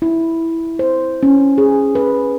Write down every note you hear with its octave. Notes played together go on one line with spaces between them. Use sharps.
E4
C5
C#4
G#4
B4